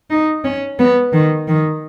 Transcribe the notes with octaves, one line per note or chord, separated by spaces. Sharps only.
D#4
C#4
B3
D#3
D#3